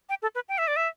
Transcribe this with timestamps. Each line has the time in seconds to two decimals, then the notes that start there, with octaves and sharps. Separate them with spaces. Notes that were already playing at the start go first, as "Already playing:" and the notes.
0.09 G5
0.22 A4
0.35 B4
0.49 G5
0.58 E5
0.68 D5
0.76 E5